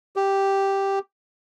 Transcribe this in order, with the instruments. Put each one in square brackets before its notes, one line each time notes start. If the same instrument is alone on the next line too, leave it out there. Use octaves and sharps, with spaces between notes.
[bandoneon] G4